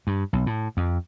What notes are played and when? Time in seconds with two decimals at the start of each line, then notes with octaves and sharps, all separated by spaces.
0.07 G2
0.33 B1
0.46 A2
0.77 F2